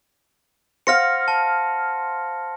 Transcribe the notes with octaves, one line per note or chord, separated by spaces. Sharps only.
C5 F5 F#5 F6 A#6 C#7
A5